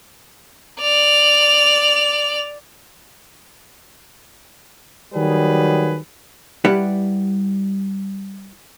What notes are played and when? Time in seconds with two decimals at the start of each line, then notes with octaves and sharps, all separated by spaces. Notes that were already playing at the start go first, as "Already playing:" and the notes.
0.80 D5 F7
5.14 D#3 F#3 G3 G#4 B4
6.65 G3 E4 G4 B4 D5 F#5